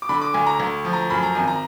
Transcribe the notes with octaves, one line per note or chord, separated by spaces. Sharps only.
D6
D3 B5
D6
D2 G#5
A#5
D2
F3
A#5
F#2 B5
A#5
G#1 G#5
A#5